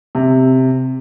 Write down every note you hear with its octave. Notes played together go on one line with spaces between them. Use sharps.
C3